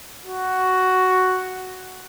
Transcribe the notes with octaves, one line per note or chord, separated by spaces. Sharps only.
F#4